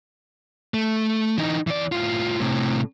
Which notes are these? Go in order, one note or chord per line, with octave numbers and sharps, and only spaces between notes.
A3
E3 D#4
E3 D5
A2 F4
A2 C3